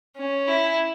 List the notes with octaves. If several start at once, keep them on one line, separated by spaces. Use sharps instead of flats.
C#4
E4